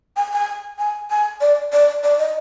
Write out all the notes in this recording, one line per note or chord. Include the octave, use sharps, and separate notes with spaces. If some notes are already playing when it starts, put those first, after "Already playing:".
G#5
G#5
G#5
G#5
D5
D5
D5
D#5